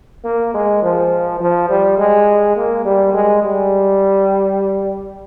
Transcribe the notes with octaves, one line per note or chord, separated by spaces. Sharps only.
A#3
G#3
F3
F3
G3
G#3
A#3
G3
G#3
G3